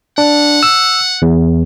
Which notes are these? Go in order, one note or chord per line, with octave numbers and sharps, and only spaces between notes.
D4 F#5
E6
E2